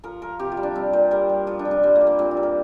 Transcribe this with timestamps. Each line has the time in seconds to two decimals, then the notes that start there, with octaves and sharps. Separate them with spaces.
0.03 F3 A#4
0.22 F3 A#4
0.39 C3 G4
0.52 F4
0.57 G3
0.63 D4
0.75 G3 C4
0.93 A#2 C5
1.11 G3 A#4
1.29 G3
1.47 F3 F4
1.59 D4
1.65 C3
1.71 D4
1.83 G3 C4
1.95 A#3
2.01 G3
2.07 A#3
2.19 A#2 C4
2.31 F4
2.37 G3
2.43 A#4